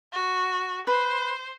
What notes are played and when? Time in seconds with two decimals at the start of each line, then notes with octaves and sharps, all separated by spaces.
0.13 F#4
0.87 B4 C5